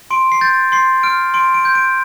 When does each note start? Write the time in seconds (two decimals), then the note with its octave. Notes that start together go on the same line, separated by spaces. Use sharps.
0.11 C6 D7
0.32 C7
0.41 G6 A6
0.72 C6 C7
1.03 F6 D7
1.34 C6 D7
1.54 D7
1.65 G6
1.75 D7